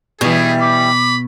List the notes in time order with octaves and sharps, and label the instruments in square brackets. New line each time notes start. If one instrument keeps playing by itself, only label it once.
[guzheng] B2 [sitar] E3 G3 [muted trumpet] G#4
[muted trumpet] B5 [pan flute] D6